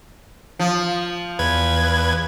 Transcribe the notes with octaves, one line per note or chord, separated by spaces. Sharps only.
F3
E2 B4 G#6